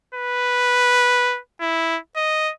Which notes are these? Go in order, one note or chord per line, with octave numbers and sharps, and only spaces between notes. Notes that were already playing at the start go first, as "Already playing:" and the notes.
B4
E4
D#5